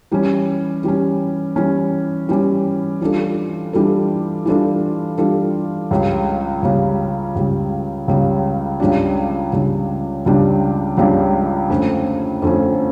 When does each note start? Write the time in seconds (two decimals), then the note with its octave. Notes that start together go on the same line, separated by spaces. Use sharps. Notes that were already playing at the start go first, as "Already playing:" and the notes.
0.11 E3 G3 C#4
0.84 E3 G3 C#4
1.56 E3 G3 C#4
2.29 E3 G3 C#4
3.01 E3 G3 D4 F4 A4
3.73 E3 G3 D4 F4 A4
4.46 E3 G3 D4 F4 A4
5.18 E3 G3 D4 F4 A4
5.91 C#2 C#3 G3
6.62 C#2 C#3 G3
7.35 C#2 C#3 G3
8.08 C#2 C#3 G3
8.80 C#2 C#3 G3 D4
9.53 C#2 C#3 G3 D4
10.26 C#2 C#3 G3 D4
10.97 C#2 C#3 G3 D4
11.70 F2 D3 A3 C#4
12.42 F2 D3 A3 C#4